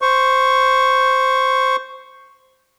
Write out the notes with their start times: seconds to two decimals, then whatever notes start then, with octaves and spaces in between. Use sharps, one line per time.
0.02 C5 C#6